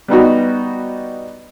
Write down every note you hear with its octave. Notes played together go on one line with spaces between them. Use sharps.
G3 B3 D#4 F#4